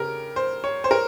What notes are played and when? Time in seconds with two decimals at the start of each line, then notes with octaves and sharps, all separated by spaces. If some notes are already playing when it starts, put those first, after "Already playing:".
Already playing: C#3 G4 A#4
0.36 C5
0.64 C#5
0.84 C5
0.91 A#4